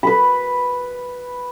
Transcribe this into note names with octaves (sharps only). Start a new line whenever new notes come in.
B4 B5